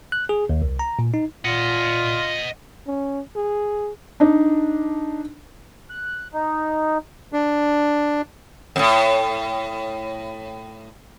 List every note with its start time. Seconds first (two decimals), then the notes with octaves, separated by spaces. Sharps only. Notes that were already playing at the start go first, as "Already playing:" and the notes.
0.12 F#6
0.29 G#4
0.49 D#2
0.62 C2
0.79 A#5
0.99 A#2
1.14 D#4
1.45 A#2 F4 D#5 F#5
2.87 C#4
3.36 G#4
4.20 D4 D#4
5.90 F#6
6.34 D#4
7.33 D4
8.76 F2 A2